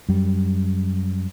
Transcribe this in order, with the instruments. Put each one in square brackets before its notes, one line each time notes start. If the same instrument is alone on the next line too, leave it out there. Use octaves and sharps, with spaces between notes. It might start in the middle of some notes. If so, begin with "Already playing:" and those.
[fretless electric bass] F#2 G3